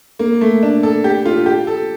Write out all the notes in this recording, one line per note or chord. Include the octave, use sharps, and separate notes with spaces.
A#3
A3
D4
A4
G4
F4
G4
A4